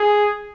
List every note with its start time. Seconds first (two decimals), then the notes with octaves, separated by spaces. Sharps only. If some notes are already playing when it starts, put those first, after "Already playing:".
Already playing: G#4